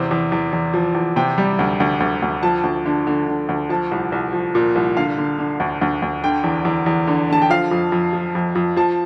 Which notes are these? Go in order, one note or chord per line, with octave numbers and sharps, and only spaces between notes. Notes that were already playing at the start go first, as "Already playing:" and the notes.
Already playing: E2 C3 C5
E2
E2
E2
F3
E2
C3 G5
G3
D2
D2
D2
D2
F3 A5
D2
D3
D3
D3
D2
F3 A5
C2
C2
F3
A#2
C2
D3 F5
D3
D3
D2
D2
D2
D3 G5
E2
E2
E2
D3
D3 A5
G5
F3 F5
F2
F2
F3
F2
F2
F3 A5